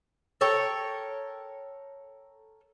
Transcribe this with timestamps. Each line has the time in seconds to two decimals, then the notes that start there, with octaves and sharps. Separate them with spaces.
0.41 A4 A#4 C#5 G5